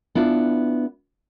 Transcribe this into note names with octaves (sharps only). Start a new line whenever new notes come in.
B3 D4 E4 F4